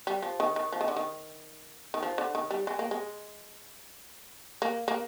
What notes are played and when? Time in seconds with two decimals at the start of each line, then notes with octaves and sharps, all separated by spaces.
0.07 G3
0.22 F3
0.40 D#3
0.56 D#3
0.72 F3
0.81 D#3
0.88 D3
0.97 D#3
1.94 D#3
2.03 F3
2.18 D3
2.35 D#3
2.51 G3
2.67 G#3
2.79 A#3
2.91 G#3
4.62 A#3
4.88 A#3